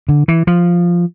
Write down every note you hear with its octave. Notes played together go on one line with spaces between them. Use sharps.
D3
E3
F3